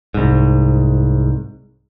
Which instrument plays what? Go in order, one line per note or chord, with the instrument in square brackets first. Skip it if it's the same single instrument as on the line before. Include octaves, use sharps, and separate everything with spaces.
[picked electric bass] C2 G#2